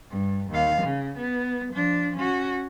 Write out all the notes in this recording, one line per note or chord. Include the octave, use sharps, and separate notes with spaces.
G2
D#2 F5
C#3
B3
F3 D4
C#4 F#4